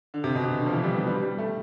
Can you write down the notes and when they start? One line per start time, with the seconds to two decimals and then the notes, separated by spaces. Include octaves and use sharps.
0.14 D3
0.24 C3
0.35 B2
0.45 C3
0.60 D3
0.67 F3
0.73 E3
0.84 G3
0.96 B3
1.07 G3
1.23 G3
1.38 A3